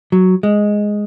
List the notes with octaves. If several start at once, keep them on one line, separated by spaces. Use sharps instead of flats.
F#3
G#3